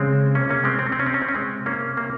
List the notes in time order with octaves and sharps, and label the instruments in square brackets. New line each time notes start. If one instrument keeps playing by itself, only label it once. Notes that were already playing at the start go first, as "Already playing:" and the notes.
Already playing: [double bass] C#3 [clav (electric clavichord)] G#3 C4
[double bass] C3 [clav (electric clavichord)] A#3 C#4
[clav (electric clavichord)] A#3 C#4
G#3 C4
[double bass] C3 [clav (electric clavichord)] C4
[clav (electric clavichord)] C#4
C4
C#4
C4
C#4
C4
C#4
G#3 C4
[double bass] C3 [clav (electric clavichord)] A#3 C#4
[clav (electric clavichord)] A#3